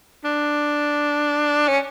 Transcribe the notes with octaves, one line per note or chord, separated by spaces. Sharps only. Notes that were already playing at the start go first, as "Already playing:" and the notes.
D4
C#4